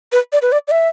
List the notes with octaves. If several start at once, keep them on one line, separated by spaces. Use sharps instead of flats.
B4
D5
B4
D5
D5
E5